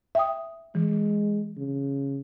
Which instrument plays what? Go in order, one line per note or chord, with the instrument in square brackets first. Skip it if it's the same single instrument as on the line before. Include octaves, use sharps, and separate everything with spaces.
[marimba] E5 G5 D#6
[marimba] E3 [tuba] G#3
[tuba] C#3